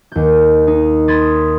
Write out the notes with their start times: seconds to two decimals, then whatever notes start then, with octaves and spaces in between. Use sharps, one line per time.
0.12 D#2 G6
0.67 D#4
1.08 B5 C6 D#6 G#6 A6